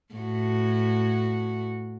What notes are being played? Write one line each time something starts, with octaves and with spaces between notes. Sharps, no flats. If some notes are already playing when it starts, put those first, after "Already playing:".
A2 F#4